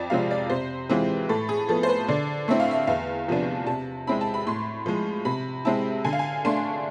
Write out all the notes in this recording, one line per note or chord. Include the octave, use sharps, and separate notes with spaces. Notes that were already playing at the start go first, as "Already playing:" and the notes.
Already playing: F2 D5
C3 F3 G#3 C4 F5
D5
C3 C5
E3 G#3 C4 F4
A2 A4
G#4
F3 B3 A4
C5
B4
D3 D5
A3 C4 E4 E5
F5
E5
E2 F5
C3 F3 B3 D4
C3 A5
G#3 C4 E4 B5
A5
B5
A2 C6
F3 G#3
C3 B5
G#3 C4 E4 A5
D3 G#5
F5
G#5
A3 D4 C6